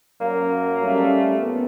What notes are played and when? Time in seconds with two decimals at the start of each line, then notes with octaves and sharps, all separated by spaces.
0.21 F#2 F#3 A#3
0.84 G3 A3 C#4
1.36 A#2 B3